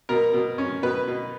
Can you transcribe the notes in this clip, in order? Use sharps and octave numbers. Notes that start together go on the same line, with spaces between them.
B2 A#4
B2
C#4
B2 B4
B2